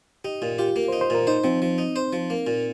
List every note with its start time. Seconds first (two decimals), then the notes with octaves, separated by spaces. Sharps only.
0.24 D#4 G4
0.42 A#2 F4
0.59 F4 G4
0.76 A#3
0.88 C5
0.93 D#4
1.01 C5
1.10 A#2 A#4
1.27 D#4 C5
1.44 F3 C4
1.62 F3
1.78 D#4
1.96 C5
2.13 F3
2.30 A#3
2.47 A#2